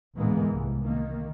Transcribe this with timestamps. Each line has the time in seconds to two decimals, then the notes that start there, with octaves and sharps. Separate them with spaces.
0.14 D2 G#2 E3 G#3 A#3 B3
0.50 C2
0.83 D#3 A#3